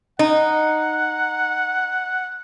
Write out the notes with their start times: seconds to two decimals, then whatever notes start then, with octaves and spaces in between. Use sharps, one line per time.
0.19 D#4 F#5